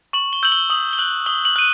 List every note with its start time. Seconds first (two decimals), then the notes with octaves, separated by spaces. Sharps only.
0.13 C#6 F#7
0.33 G7
0.43 E6 G6 F#7
0.52 G7
0.70 D#6 F#7
0.93 G7
0.98 F#6 F#7
1.26 D#6 G7
1.45 F#7
1.56 F#6 D#7